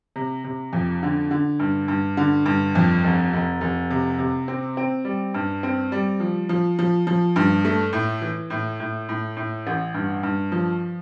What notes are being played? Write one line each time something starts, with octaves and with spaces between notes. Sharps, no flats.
C3
C3
F2
D3
D3
G2
G2
D3
G2
F2
F1
F1
F1
C3
C3
C4
C4
G3
G2
C4
G3
F3
F3
F3
F3
G2
A3
A2
E3
A2
A2
A2
A2
A1
G2
G2
F3